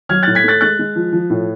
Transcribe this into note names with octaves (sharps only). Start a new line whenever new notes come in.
F#3 F6 G#6
A2 F#6 A6
G#6 B6
A3 F#6 A6
G#3 F#6 A6
G#3
F3
F3
A2